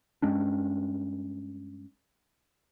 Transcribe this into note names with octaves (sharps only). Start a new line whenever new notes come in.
G2 G#3 C#4 D4